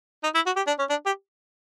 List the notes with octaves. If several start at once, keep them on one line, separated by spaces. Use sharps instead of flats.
D#4
E4
F#4
G4
D4
C#4
D4
G4